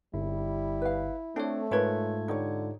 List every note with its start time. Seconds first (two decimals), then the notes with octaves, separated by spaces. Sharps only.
0.14 G1 G3 E4
0.82 B4 F5
1.36 A3 C4 D4 F4 A4 C#5
1.71 G#2 F4 A#4 B4 C#5 G#6
2.28 D3 D#4 G4 C#5